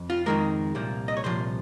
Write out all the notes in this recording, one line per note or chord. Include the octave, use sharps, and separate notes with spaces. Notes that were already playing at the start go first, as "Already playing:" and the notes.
Already playing: F2
F4
F2 D#3 G#3 A#4
C2 A#2 F3
D#5
C#5
C2 A#2 F3 C5